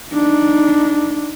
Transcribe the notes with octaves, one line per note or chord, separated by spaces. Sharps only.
D4 D#4